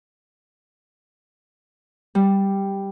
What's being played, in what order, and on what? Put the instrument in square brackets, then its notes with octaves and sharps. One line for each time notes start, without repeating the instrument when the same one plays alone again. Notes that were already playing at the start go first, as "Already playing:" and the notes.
[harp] G3